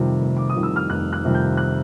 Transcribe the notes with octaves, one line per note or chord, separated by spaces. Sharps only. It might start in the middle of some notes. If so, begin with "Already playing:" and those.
Already playing: F1 F2 C3 D#3 G3
F1
D6
D#6
F2 C3 D#3 G3
E6
F6
F1 F#6
F#6
F2 C3 D#3 G3
G6
F#6